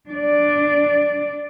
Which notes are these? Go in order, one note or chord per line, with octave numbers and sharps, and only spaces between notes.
D4 D5